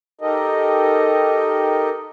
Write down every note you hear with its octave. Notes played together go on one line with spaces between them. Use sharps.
D#4 G4 A4 A#4 D#5